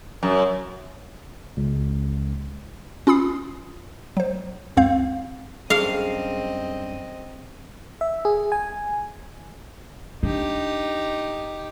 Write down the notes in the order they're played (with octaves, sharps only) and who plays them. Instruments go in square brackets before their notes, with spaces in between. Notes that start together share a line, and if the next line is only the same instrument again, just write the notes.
[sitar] F#2
[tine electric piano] C#2
[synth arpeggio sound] C#4 F4 B5 D#6 C7
F#3 C5
C#2 F#2 C4 F5 G6
[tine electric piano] F#2 G3 D4 [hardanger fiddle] C4 D#5 [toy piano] G#4 C#6 [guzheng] F5
[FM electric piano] E5
G#4
G#5
[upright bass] D4 [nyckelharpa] D#4 G4